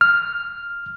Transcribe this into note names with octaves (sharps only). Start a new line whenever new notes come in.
F6